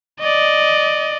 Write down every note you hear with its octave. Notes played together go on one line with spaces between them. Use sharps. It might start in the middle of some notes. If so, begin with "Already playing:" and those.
D5 D#5